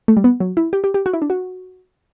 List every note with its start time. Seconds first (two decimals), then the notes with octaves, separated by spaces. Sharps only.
0.08 A3
0.17 G3
0.24 B3
0.40 F#3
0.57 E4
0.73 G4
0.84 G4
0.94 G4
1.06 F#4
1.13 E4
1.22 D4
1.30 F#4